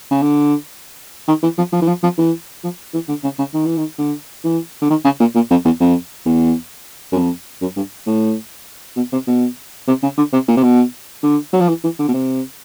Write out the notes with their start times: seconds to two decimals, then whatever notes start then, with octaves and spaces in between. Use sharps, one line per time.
0.11 C#3
0.22 D3
1.28 D#3
1.43 E3
1.58 F3
1.72 F3
1.82 E3
1.88 F3
2.03 F3
2.18 E3
2.64 F3
2.94 E3
3.08 D3
3.24 C#3
3.39 C#3
3.54 D#3
3.66 E3
3.77 D#3
3.99 D3
4.44 E3
4.82 D3
4.90 D#3
5.04 C#3
5.20 A#2
5.35 A#2
5.50 F2
5.65 E2
5.80 F2
6.25 E2
7.12 F#2
7.16 F2
7.61 F#2
7.76 G2
8.06 A2
8.96 B2
9.12 C3
9.27 B2
9.87 C3
10.03 C#3
10.17 D3
10.33 C3
10.48 A#2
10.57 C3
10.63 B2
11.23 D3
11.53 F#3
11.60 F3
11.68 E3
11.84 E3
11.99 D3
12.08 B2
12.14 C3